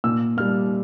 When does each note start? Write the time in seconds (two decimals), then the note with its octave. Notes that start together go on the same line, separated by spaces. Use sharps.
0.04 A#2 E6
0.37 G3 A#3 F6